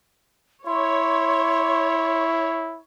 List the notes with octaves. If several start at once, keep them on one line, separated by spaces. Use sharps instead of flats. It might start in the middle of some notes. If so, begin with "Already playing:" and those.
E4 C#5 C6